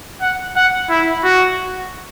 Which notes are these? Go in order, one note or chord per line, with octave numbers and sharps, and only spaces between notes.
F#5
F#5
E4
F#4